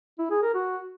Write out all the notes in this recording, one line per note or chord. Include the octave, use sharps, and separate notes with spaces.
E4
G#4
A#4
F#4